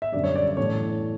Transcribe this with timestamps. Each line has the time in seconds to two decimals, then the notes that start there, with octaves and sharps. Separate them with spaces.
0.02 E5
0.12 F#2 D3 G3 D5
0.24 C#5
0.36 D5
0.47 D5
0.57 A2 E3 A3 C#5